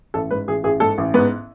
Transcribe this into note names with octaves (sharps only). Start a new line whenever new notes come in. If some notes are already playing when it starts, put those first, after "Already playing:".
A1 A4
G#2 B4
A1 G#4
A1 G#4
G#2 A4
A1
G#2 B3